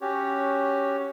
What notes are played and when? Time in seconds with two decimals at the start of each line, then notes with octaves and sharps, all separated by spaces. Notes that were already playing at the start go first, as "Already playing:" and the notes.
0.01 C#4 F#4 G4 C#5